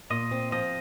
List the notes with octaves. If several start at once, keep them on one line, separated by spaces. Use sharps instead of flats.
A#2 D#5
C4
F3 D#5